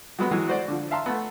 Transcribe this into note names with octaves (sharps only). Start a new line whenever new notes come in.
F#3 G#3 B3
E3 F#3 G#3
F#4 C5 D5
D3 F3
E5 F5 A5 A#5 C6
A3 B3